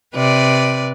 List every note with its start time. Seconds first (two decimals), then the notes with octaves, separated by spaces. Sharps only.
0.14 C3 B4 D5